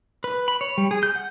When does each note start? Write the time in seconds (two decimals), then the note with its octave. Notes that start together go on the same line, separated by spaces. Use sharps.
0.24 B4
0.48 B5
0.61 C#5
0.78 G3
0.91 G#4
1.03 G6
1.15 F#5